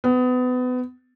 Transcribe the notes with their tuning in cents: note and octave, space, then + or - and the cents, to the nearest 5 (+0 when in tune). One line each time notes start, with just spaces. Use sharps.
B3 +30